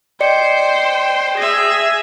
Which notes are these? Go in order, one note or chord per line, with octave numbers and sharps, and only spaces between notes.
C5 D5 D#5 G5 C#7
G#4 E5 A#6